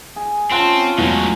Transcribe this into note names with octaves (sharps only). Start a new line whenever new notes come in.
G#4
C4 C#4 F4 F#5 A5 C6
E2 A2 F#3 G#3